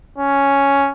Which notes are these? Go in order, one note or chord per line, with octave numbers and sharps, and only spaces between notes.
C#4